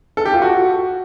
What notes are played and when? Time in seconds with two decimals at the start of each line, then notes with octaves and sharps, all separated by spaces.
0.17 A4
0.25 G4
0.34 F4
0.42 F#4